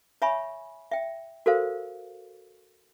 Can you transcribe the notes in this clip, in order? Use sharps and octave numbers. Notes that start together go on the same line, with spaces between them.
C#5 E5 G#5 B5 C#6
E5 G5
F#4 A4 A#4 C5 F5